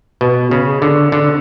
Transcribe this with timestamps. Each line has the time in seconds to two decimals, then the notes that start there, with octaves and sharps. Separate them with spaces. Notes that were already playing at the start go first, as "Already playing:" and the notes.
0.21 B2
0.51 C#3
0.82 D3
1.12 D3